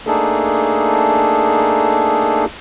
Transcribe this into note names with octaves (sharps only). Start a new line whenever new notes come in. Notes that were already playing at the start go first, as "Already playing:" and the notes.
A3 A#3 D4 D#4 G#4 A4